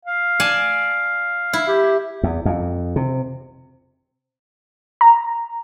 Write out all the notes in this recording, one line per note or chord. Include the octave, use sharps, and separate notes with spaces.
F5
D5 G#5 A5
E4
G4
E2
F2
C3
A#5